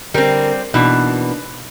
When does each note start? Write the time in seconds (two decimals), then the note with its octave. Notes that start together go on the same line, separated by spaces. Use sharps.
0.14 D3 G3 C4 A#4
0.74 B2 E3 A#3 D4 D#4